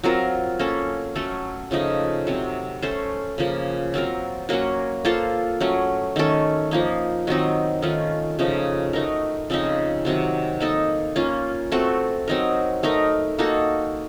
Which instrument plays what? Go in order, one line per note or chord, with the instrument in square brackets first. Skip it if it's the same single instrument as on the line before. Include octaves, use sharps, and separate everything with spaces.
[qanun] F#3 C4 F4 A#4
A#3 C#4 A4
F#3 A3 C#4 A4
C#3 F3 A3 D#4
C3 F#3 C4
A3 C#4 A4 C5
C#3 F3 A#3
F#3 C4 F4 A#4
F#3 A#3 C#4 F#4
A#3 F4 A4 C5
F#3 A3 C#4
D#3 A3 C#4 A4
F3 A#3 D#4
D#3 F#3 C4 D#4
D#3 A3 C#4 F4
C#3 F3 A3 D#4
A3 D#4 F#4 A#4
C#3 F3 C4 D#4
C3 D#3 F#3 C4
A#3 D#4 A4
A#3 C#4 F4
A3 C4 F#4 A4
F#3 C4 D#4 A#4
A3 D#4 A#4
A#3 D#4 F#4 A4